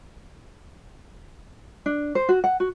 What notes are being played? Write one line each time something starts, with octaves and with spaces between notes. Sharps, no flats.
D4
C5
F#4
F#5
F#4